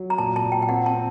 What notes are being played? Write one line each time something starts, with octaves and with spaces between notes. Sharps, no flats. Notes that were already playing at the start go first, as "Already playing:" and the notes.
Already playing: F#3
A#5
A#2 A5
A5
A#2
G5
G5
C4 F#5
A5
C4